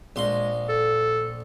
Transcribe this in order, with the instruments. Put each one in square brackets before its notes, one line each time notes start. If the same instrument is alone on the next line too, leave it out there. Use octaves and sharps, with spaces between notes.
[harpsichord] A#1 C6 [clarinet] G#3
[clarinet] A4